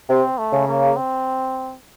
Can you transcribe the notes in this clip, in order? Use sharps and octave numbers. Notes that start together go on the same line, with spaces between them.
C3 C4
A3
C#3
A#3
C4